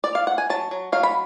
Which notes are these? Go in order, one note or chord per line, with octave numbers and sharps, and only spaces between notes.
D5
F5
F#5
G#5
F#3 A5
F#3
F#3 F5
B5